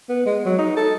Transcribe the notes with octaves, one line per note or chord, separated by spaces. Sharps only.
B3
G#3
F#3
D#4
A4